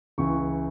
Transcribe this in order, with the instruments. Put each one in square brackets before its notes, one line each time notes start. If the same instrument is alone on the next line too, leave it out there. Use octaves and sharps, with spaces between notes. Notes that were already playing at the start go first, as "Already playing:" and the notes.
[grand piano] C#2 C#3 E3 C#6